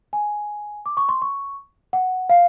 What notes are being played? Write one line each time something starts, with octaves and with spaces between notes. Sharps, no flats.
G#5
D6
C#6
C6
C#6
F#5
F5